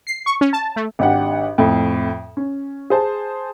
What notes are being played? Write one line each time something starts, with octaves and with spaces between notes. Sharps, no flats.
C7
C#6
C#4
A5
A3
G#1 D4 G4 F#5
F2 A2
C#4
G#4 C5 A5